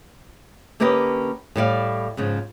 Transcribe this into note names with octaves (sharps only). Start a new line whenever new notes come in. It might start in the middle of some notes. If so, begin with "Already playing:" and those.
D3 A#3 C#4 G4 B4 D#5
A2 G3 D5 F5
G#2 C#3 F3